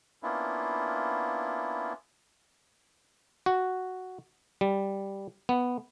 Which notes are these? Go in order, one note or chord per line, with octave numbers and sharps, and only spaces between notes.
A#3 B3 C#4 D4 E4 F4
F#4
G3
B3